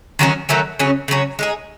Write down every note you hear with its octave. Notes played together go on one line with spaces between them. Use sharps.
D#3 F#3 A3 C#4
D#3 F#3 A3 C#4
C#3 F#3 C#4
C#3 F#3 C#4
G#3 D#4 G#4